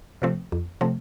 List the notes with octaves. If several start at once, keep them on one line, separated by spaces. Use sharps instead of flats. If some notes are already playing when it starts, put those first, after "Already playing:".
C3 F3 A3 C4
F2
C3 F3 A3 C4